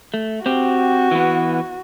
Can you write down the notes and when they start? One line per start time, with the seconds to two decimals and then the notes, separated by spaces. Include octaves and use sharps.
0.14 A3
0.46 C4 F#4 G4
1.11 E3 B3